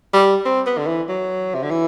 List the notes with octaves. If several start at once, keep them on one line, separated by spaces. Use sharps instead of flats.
G3
C4
B3
D3
E3
F#3
C3
D3
E3